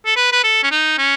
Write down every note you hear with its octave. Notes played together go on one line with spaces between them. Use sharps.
A4
B4
B4
A4
C#4
D#4
C#4